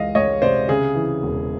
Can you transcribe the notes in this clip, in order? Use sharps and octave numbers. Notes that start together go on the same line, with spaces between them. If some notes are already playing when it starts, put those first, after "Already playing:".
Already playing: C#2 E3 D#5 F5
C#2 C#5 D#5
C3 C5 D5
C#3 G#4
E3
E1